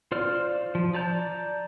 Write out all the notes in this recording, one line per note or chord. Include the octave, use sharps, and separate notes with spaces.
F4 C5 D5 F6
F3
D5 A5 A#5 G6